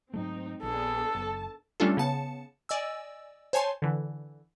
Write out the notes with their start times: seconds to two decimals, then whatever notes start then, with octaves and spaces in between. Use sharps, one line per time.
0.14 G#2 F#3 A3 C4 D#4
0.63 A#1 B3 D4 G#4 A4
1.14 F#1 A5
1.80 G3 A3 C#4 D4 F4 A4
1.97 C#3 B3 A5 C#7
2.69 D5 D#5 G#5 E6
3.53 C5 C#5 G#5 A5 C6
3.82 D3 E3